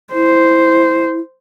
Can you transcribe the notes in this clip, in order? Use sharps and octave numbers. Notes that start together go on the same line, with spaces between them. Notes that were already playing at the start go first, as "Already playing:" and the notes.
E4 C5